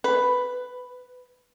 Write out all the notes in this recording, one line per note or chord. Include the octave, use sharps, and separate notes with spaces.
B4